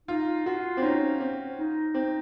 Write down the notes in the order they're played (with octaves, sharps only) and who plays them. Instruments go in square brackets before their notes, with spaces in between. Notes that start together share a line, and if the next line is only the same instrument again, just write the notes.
[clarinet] D#4 [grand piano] F4
[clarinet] F4 [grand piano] F#4
[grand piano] C4
[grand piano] C#4 [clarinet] D#4
[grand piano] C4
[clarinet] D#4
[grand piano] C4